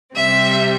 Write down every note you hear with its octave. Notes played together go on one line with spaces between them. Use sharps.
C3 G3 C4 E5